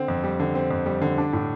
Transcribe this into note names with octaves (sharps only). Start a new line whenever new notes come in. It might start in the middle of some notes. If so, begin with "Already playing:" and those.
Already playing: D3 C4
F2
G3
D3
C4
F2
G3
D3
D4
A2